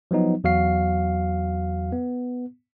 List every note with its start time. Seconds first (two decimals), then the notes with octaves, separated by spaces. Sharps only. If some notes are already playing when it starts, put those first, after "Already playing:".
0.11 F3 F#3 B3 D#4
0.44 E2 F#3 F#4 F5 C7
1.92 B3